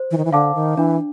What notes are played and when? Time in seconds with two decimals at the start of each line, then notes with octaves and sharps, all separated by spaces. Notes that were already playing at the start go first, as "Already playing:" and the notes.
Already playing: C5
0.11 E3
0.17 D#3
0.25 E3
0.32 D3 F5 A5 D6
0.55 D#3
0.77 E3 D4